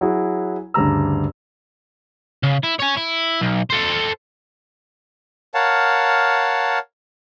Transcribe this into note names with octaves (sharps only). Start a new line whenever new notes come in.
F#3 E4 F#4 G#4
D2 G2 C#3 G4 A#5 E6
C#3
E4
C#5 G#5
E4
B1
A4 C5
A#4 C#5 F5 F#5 A5